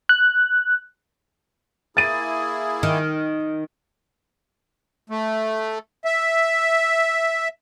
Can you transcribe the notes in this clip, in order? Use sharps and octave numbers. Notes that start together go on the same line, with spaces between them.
F#6
A#3 E4 G#4 A6 D#7
D#3
A3
E5